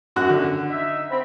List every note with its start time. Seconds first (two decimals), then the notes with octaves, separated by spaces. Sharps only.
0.16 F#2 F#4 F#6
0.30 D3
0.69 D#4 E5
1.11 C4 B5